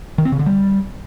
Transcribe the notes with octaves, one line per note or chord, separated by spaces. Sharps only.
D#3
C4
C#3
D3
G3